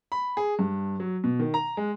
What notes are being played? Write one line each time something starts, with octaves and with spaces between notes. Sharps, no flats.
B5
G#4
G2
F#3
B2
D#3
A#5
G#3